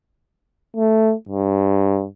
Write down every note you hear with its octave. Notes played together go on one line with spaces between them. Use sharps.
A3
G2